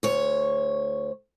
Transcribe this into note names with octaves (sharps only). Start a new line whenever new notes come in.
D2 C#5